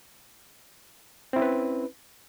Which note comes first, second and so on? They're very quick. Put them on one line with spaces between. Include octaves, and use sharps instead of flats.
C4 E4 C#4 B4